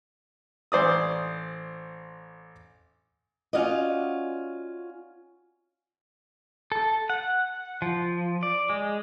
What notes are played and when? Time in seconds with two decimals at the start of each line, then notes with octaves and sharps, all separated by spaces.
0.72 A1 C5 D5 D#6
3.53 C#4 F4 F#4 D5 D#5
6.72 A4
7.10 F#5
7.82 F3
8.43 D5
8.70 G#3